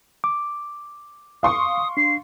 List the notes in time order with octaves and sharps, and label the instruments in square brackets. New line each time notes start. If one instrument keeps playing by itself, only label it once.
[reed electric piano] D6
[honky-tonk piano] F5 C6 C#6 [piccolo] D#6
[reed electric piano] D4 [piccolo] C7